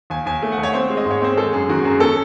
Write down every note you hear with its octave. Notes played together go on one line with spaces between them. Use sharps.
D#2 G#5
D#2 G#5
A3
F#5
D#2
C#5
C4 C5
G#3
D#5
G#2
C#5
C4 C5
G#3 A4
F#2 G#4
D#3 F#4
F#2 G#4
C#4 A4